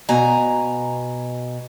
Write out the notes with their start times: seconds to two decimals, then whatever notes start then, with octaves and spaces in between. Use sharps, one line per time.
0.09 B2 G#5 A#5